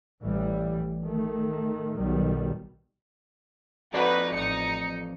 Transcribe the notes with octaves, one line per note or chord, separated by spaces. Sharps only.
A1 E3 G3
D#3 A3
B1 B2 D#3 F#3 G3
F2 D#4 F#4 A4 B4 D5
A1 D#4 C#7